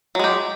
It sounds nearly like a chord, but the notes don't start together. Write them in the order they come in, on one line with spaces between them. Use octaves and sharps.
F#3 G#3 G4